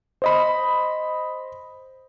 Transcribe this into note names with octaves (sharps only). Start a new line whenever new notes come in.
C5 D#5 B5